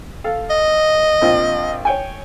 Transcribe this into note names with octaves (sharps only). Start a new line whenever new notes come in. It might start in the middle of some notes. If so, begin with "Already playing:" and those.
A4 F5
D#5
A#1 C4 F4
C#5 G5 G#5